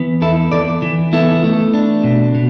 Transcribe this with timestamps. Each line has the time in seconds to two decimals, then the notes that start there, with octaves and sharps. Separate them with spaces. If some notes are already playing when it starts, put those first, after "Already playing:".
Already playing: E3 B3
0.21 E2 E4 A4
0.52 E2 A4 D5
0.82 E3
1.13 B3 E4 A4
1.44 A3
1.74 D4
2.04 B2
2.35 B2